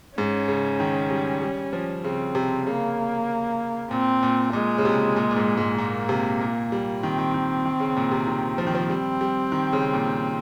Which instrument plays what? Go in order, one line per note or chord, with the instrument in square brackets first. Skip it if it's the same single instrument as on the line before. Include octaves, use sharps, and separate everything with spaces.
[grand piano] G#2 [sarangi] C#4
[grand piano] C#3
D#3
G3
G3
F3
[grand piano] C#3 [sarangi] C4
[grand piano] C3
[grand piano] C#3 [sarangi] A#3
[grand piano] A#2 [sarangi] C4
[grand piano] A#2
[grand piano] A#2 [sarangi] G#3
[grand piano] C#3
C3
A#2
A#2
G#2
G#2
[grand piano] A#2 [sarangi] A#3
[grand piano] C3
A#2
G3
[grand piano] D#3 [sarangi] C4
[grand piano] D#3
D#3
D#3
C#3
A#2
C3
D#3
F3
D#3
F3
[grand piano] G3 [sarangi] C4
[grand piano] G3
D#3
C#3
A#2